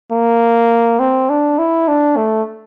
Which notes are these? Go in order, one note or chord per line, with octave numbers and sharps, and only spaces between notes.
A#3
C4
D4
E4
D4
A3